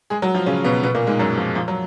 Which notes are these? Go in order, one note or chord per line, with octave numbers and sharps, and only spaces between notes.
G#3 G#4
F#3 F#4
F3 F4
C#3 C#4
B2 B3
B2 B3
A#2 A#3
G#2 G#3
F#2 F#3
F3
F3
F#3